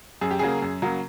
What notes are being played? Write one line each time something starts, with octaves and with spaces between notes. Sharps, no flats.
F#2 G#4
G4
C#3 F#3 A#3 G#4
F#2
C#3 F#3 A#3